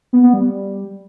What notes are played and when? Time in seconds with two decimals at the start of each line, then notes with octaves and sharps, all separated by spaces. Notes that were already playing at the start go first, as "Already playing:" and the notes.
0.13 B3
0.23 B3
0.33 G3